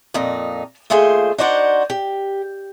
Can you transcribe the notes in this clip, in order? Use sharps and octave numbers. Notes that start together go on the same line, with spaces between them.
F2 A#2 D#4
D#2 A3 F4 G#4 C5
D4 D#4 F#4 C5 D5 F#5
G4